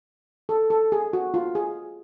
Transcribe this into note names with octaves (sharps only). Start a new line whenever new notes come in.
A4
A4
G#4
F#4
F4
G#4